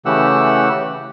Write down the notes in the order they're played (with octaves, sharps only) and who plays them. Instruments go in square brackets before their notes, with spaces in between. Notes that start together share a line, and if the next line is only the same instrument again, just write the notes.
[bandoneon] C#3 E3 A3 G4 F#5 E6